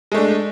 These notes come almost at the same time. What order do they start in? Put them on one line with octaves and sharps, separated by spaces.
G#3 A3 D4